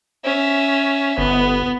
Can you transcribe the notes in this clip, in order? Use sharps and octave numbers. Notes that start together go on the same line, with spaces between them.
C#4 E5
G1 B3